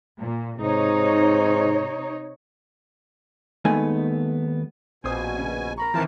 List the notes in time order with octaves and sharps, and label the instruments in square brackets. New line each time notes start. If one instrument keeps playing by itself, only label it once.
[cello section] A#2
[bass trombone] G#2 [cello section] C3 D#4 C#5
[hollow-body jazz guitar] D#2 G#3 A3 B3 D#4 G#5
[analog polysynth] A#1 [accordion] B2 G#5 [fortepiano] C4 C5 D#6
[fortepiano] C#3
[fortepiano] A#4 B5 C#6 [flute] A#5
[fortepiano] C2 C4 [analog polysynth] D#3 E3 [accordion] A#4 A5